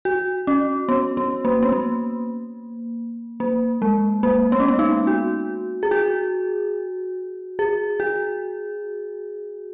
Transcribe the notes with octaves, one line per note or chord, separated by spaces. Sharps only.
F#4
C#4
B3
B3
A#3
B3
A#3
A#3
G#3
A#3
B3
C#4
B3
D#4
F#4
G#4
F#4
G#4
F#4